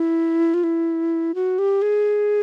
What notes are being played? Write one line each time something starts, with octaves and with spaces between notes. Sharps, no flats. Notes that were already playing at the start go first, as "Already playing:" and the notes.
Already playing: E4
F4
E4
F#4
G4
G#4